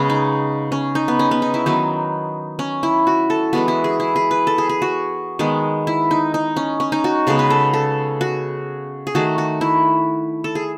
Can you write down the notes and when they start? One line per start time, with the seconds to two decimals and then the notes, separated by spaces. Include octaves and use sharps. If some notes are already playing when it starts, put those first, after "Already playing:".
Already playing: C#3 G#3 B3 C#4
0.10 D#4
0.72 C#4
0.95 D#4
1.08 B3
1.19 C#4
1.31 B3
1.42 D#4
1.54 E4
1.66 D#3 F#3 B3 D#4
2.59 C#4
2.83 E4
3.07 F#4
3.30 A4
3.53 E3 G#3 B3 F#4
3.68 E4
3.84 G#4
4.00 E4
4.16 G#4
4.31 B4
4.47 A4
4.58 G#4
4.69 G#4
4.82 F#4
5.39 D#3 G#3 B3
5.87 E4
6.11 D#4
6.34 D#4
6.56 C#4
6.80 C#4
6.92 D#4
7.04 F#4
7.27 C#3 G#3 B3 A4
7.39 B4
7.50 A4
7.74 A4
8.21 F#4
9.07 G#4
9.15 D#3 A3 F#4
9.38 F#4
9.61 E4
10.44 A4
10.55 G#4